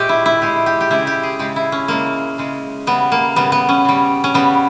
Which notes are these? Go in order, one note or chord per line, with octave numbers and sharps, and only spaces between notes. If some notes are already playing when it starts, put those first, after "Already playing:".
Already playing: A#2 G#3 G4 C#5 E5
E4
E4
A#2 G#3 G4
G4
G4
C#3 G#3 E4
G4
G#4
C#3 G#3 G4
E4
C#4
C#3 G#3 A#3
C#3 G#3
C#3 G3 B3
A#3
C#3 G3 B3
B3
C#4
C#3 G3
C#4
C#3 G3 B3